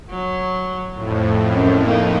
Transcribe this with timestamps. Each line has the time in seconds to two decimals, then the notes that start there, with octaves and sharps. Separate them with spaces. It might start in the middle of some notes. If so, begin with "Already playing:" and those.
0.10 F#3
0.94 F2 A2
1.52 F#2
1.85 A#3 D#4